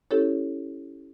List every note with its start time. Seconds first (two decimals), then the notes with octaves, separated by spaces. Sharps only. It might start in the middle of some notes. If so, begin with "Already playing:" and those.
0.11 C#4 E4 G4 A4 C#5